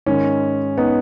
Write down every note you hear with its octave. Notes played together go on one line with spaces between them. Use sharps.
G#2 D#3 G#3 C#4
B3 D#4